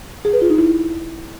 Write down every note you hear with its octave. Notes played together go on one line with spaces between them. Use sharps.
G#4
B4
F4
D#4
E4